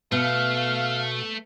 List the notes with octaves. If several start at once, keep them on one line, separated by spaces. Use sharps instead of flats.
B2 A3 F5